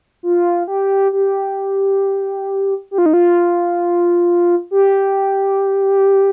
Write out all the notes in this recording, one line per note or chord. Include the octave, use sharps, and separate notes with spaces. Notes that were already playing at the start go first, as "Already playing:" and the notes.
F4
G4
G4
G4
F4
D#4
F4
G4